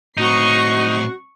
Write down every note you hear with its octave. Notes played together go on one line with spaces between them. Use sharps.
A2 C4 D#4 F#4 C#6 C7